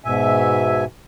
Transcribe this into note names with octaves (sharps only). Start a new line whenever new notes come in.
G#2 B2 E5 G#5